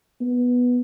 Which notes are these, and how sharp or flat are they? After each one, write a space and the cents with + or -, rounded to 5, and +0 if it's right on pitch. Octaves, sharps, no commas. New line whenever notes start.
B3 -5